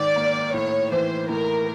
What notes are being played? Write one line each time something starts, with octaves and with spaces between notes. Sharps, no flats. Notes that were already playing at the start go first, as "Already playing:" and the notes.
Already playing: G#2 D#3 D5
A#3
A2 C#5
E3 C5
A2 A#4